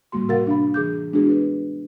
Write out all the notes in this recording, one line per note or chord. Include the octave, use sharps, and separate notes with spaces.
A2 G3 A#3 F#4 C6
C3 F#4 A#4 F5 F#5 A6
D4 F5 B5
E3 G#4 D6 G6
G#3 B3 D4 E4 F#4 G#4
B4